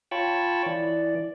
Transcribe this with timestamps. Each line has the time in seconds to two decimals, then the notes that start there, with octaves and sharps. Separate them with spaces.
0.11 F4 C#5 G5 A5 B5 C#6
0.66 E3 D5